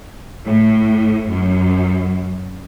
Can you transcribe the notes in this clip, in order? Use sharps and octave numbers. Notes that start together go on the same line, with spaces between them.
A2
F#2